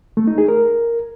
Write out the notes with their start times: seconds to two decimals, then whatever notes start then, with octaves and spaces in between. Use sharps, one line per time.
0.17 A3
0.27 D#4
0.38 G#4
0.48 A#4